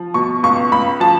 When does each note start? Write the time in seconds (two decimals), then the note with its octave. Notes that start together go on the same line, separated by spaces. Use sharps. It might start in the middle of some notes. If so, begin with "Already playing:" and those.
Already playing: F3
0.14 B2 C#6
0.43 C#2 C#6
0.72 C#2 B5
1.00 F3 A5